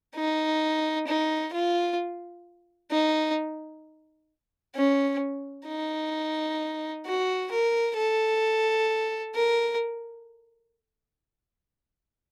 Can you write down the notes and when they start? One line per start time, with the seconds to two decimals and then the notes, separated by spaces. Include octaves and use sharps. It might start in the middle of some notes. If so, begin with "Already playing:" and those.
0.16 D#4
1.07 D#4
1.54 F4
2.91 D#4
4.75 C#4
5.67 D#4
7.06 F#4
7.51 A#4
7.97 A4
9.35 A#4